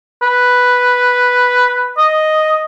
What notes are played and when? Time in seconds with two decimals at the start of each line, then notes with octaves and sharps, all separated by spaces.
0.22 B4
1.98 D#5